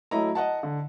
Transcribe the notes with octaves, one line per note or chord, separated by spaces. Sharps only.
F#3 A3 E4 D#5 A#5
D#5 F#5 A5
D3